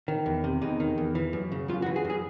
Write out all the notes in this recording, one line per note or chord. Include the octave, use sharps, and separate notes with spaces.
D#3
E2
C3
E2 D#4
D#3
E2
E3
F#2
C#3
F#2 F4
F#4
E3
G#4
F#2
G#4